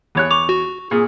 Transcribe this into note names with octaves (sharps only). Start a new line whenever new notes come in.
E2 C#5 F#6
C#6 D6 F7
F#4
A#2 G#4